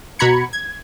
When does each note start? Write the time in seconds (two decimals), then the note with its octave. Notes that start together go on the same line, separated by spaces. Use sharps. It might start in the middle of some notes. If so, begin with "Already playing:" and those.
0.19 B2 F#4 A#5 B5 G#6 C#7
0.53 G#6